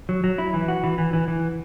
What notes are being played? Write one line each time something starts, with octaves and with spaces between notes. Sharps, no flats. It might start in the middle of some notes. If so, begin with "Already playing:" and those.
F#3
F#3
E4
E3
F#4
E3
E3
E3
E3